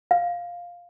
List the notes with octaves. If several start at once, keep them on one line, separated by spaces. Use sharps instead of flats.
F5